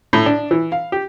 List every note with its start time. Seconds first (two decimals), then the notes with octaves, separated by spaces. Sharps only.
0.13 A2
0.26 D4
0.51 E3
0.72 F5
0.92 G4